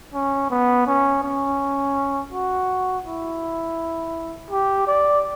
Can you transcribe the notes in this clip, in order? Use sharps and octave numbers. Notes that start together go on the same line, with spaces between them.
C#4
B3
C#4
C#4
F#4
E4
G4
D5